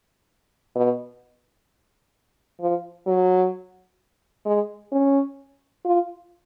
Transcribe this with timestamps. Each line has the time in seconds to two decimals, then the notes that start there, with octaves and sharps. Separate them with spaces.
0.75 B2
2.60 F3
3.07 F#3
4.46 G#3
4.92 C#4
5.85 F4